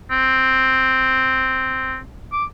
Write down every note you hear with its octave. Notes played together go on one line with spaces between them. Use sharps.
C4
D6